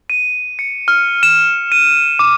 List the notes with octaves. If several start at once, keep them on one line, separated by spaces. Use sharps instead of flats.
D#7
C#7
F6
E7
D#7
D6